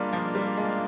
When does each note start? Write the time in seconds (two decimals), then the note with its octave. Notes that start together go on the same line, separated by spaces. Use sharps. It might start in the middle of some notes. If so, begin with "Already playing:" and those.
Already playing: G3 G#3 A#3 D4 F4
0.13 F3
0.35 G3
0.57 G#3